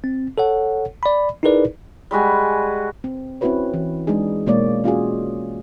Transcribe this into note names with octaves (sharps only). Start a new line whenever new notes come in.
C4
A4 C#5 F#5
D5 B5
D#4 E4 G#4 A#4 B4 D5
G3 G#3 F#4 G#5
C4
C4 C#4 E4 F#4 B4 C#5
E3
G#3 D4 D#4 G#4
B2 G#3 A#3 C#5 D5
C#4 F4 F#4 G#4